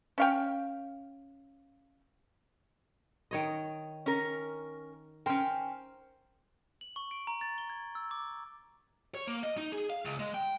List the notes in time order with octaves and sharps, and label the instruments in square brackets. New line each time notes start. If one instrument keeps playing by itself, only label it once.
[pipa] C#4 F5 G5
[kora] D#3 C#5 D#5
[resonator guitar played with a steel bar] C#4 A#4
[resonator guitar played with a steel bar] C#4 G5 [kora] A#4 C5
[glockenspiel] F#7
C#6
D7
A#5
A6
G7
G#6
E6
D6
[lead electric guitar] C#5
A#3
D#5
D#4
G#4
F5
C#2
G#3
G5